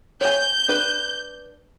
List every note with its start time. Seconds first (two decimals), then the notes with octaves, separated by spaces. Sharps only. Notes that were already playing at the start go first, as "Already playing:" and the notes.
0.21 C#5 G#5 G6
0.68 D4 B4